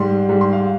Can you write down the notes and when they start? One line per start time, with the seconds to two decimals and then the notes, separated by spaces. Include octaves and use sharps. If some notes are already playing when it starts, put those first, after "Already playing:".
Already playing: G#2 G3 C6
0.29 G#2 G3
0.41 C6
0.53 F5